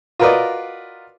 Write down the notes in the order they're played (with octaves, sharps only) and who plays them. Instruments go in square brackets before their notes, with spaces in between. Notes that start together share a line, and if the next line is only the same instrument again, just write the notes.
[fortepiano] F4 F#4 A#4 B4 D5 D#5